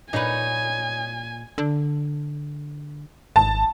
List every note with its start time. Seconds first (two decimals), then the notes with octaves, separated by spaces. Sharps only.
0.13 A#2 D#4 B4 C#5 G#5
1.58 D3
3.36 G#1 A5